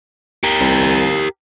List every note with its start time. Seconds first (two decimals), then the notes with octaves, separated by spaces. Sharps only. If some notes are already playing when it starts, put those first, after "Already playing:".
0.44 G4 A#4
0.60 C2